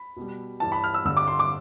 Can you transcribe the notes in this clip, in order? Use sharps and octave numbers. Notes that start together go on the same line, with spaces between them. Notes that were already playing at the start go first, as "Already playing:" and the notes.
Already playing: B5
B2 G3
G2 E3 G3 A5
B5
F6
E6
G2 D3 G3 E6
D6
C6
D6